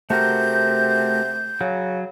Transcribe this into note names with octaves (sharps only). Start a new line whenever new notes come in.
C3 A3 F#4 A#4 G6
C#3 F#3